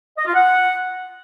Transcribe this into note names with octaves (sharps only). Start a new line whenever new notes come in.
D#5
F4
F#5